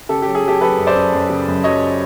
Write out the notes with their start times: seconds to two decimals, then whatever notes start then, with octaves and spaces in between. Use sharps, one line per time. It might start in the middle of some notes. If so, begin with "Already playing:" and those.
0.09 C#3 G4 A4
0.22 F#3 G4
0.35 G#4
0.44 F#3 G4 A4
0.61 F#3 A4 B4
0.78 F#2
0.87 C5 D5
0.96 F#2
1.13 F#2
1.29 C#3
1.47 F#2
1.64 F#3 C#5 D#5